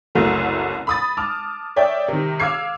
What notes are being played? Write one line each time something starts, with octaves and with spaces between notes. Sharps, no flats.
F#1 C2 F#3 A3 A#5
B5 D#6 A6
A5 D6 D#6 F6
C#5 D5 E5 G5
C3 D#3
F5 D6 E6 G#6 C7